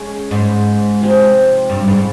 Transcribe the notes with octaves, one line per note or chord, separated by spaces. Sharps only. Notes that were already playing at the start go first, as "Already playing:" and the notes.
Already playing: G#3 C#4 G#4
G#2
C3 F3 C4 G4
G2
G#2